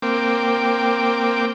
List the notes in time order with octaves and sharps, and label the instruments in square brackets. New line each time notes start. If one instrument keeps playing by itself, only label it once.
[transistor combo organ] A#3 C4 G5 D6